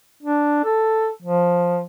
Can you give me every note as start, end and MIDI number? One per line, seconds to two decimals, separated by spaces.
0.22 0.60 62
0.64 1.08 69
1.22 1.84 53